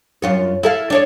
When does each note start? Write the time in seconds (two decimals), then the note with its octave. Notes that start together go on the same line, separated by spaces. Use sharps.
0.22 F#2 F4 C#5
0.63 E4 A4 F5
0.90 D4 C#5 D5